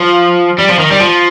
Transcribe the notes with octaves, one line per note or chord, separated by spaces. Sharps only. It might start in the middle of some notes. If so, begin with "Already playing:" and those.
Already playing: F3
G3
F3
D#3
G3
F3